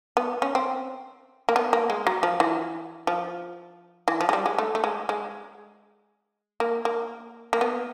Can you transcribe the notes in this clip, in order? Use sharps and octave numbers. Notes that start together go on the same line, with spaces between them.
B3
C#4
C4
A#3
B3
A#3
G#3
F#3
F3
E3
F3
E3
F3
G#3
G3
G#3
A3
A3
G#3
G#3
A#3
A#3
A#3
B3